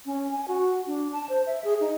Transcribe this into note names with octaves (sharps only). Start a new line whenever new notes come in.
C#4
G#5
F#4
D4
A5
C5
E5
G#4
D#4